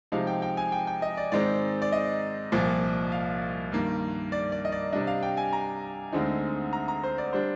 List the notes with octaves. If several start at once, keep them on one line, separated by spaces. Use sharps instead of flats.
C3 F3 G#3 D#4 F5
G5
G5
G#5
G5
G5
D#5
D5
G#2 D#3 G#3 C4 D#4 D5
D5
D#5
C2 A#2 F3
F5
G2 D#3 A#3
D5
D5
D#5
D5
C3 G3 D4 D#5
F5
G5
G#5
A#5
D2 D3 G#3 C4 D#4
A#5
A#5
C5
D5
G3 D4 C5